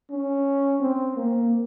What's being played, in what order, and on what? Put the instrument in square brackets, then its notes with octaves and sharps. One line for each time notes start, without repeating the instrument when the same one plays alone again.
[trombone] C#4
C4
A#3